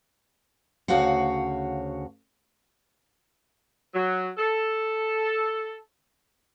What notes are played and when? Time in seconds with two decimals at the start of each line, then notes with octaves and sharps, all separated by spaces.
0.88 D2 C#3 F#4 C#5 F5 F#5
3.94 F#3
4.38 A4